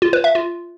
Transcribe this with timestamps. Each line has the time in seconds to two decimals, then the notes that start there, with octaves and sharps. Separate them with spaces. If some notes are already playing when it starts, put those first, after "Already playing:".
0.02 F4
0.13 B4
0.24 E5
0.35 F4